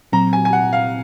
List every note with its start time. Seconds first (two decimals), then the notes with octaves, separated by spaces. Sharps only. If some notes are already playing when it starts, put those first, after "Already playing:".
0.12 A#2 F#3 C4 A#5
0.33 G#5
0.45 G#5
0.53 F#5
0.73 F5